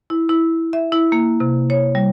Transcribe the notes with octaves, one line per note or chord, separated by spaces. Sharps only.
E4
E4
E5
E4
A#3
C3
C#5
G3